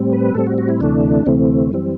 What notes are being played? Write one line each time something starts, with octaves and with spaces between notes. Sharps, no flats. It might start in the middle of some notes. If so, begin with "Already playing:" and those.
Already playing: A2 G3 C4
B4
A2 G3 C4 A4
F#4
F#4
E4
D2 C3 E3 A3 D4
D2 C3 E3 A3 C4
F#2 E3 G3 C4